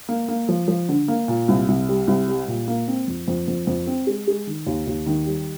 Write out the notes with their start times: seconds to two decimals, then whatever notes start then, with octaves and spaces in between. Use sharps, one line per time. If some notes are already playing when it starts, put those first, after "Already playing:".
0.09 A#3
0.28 A#3
0.49 F3
0.68 F3
0.89 D3
1.08 A#3
1.28 A#2
1.48 C2
1.68 C2
1.88 G3
2.07 C2
2.28 G3
2.48 A#2
2.68 A#3
2.88 C4
3.07 F2
3.28 F2
3.48 F2
3.67 F2
3.87 C4
4.07 G#3
4.27 G#3
4.47 D#3
4.66 D#2
4.87 D#2
5.06 D#3
5.26 G3